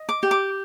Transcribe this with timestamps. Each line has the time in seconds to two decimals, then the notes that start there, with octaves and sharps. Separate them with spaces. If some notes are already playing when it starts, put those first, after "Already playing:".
Already playing: D#5
0.09 D6
0.23 G4
0.31 D6